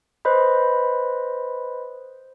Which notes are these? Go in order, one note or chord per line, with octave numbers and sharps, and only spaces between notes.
B4 C5 D#5 B5